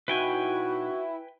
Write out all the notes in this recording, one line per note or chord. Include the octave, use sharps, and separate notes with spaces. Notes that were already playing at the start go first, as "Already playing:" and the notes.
B2 D#4 E4 F#4 B4 G5 G#5 B5